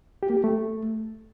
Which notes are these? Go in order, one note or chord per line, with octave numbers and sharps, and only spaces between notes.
G4
A#3
G4
A3